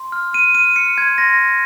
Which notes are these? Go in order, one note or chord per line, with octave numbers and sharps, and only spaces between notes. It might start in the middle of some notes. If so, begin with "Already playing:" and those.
Already playing: C6
F6
F6 D#7
F6 D#7
F6 C#7
C6 G#6
C6 A#6